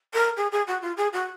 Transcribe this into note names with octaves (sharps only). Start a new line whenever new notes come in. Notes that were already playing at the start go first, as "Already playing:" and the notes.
A#4
G#4
G#4
F#4
F4
G#4
F#4